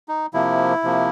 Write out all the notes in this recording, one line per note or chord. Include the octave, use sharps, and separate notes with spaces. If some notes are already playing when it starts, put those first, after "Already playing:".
D#4
C3 F3 A#3 E4
C3 F3 A#3